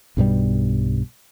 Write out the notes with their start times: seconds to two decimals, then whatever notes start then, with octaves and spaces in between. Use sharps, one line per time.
0.17 B1 G2 B2 G3